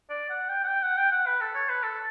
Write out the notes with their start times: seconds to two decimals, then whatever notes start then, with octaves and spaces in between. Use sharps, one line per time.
0.10 D5
0.30 F#5
0.49 G5
0.64 F#5
0.67 G5
0.83 F#5
0.97 G5
1.11 F#5
1.27 B4
1.41 A4
1.54 C#5
1.69 B4
1.83 A4